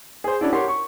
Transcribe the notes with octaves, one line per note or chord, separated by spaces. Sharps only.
G#4 C5
C#4 D4 E4 F#4
G4 A#4 C#5 F#5 C6
C#6